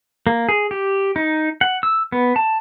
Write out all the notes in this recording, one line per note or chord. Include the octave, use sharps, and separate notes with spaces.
A#3
G#4
G4
D#4
F#5
E6
B3
A5